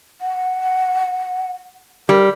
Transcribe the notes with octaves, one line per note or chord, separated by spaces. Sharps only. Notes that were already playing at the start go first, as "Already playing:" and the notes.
F#5
G3 A#4